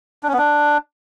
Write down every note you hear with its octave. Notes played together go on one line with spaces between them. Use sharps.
D4
C#4
B3
D4